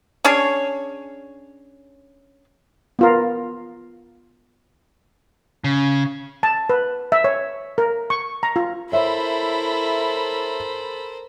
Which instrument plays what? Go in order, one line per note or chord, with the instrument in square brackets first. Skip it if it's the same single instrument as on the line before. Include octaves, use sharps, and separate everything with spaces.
[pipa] C#4 D4 G#4 C#5
[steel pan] B3 F4 A#4
[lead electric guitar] C#3
[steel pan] A5
B4
E5
C#5
A#4
C#6
A#5
F4
[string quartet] E4 [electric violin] A4 B5 [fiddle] A#4 C5 [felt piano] C#5 E5